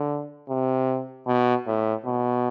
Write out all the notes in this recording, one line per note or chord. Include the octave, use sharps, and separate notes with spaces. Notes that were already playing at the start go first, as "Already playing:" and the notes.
Already playing: D3
C3
B2
A2
B2